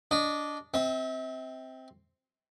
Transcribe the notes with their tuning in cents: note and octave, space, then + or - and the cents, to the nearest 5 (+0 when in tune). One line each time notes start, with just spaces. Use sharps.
D4 -15 D#5 -20
C4 +0 E5 -40